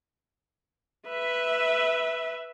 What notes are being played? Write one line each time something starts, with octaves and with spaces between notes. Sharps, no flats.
B4 E5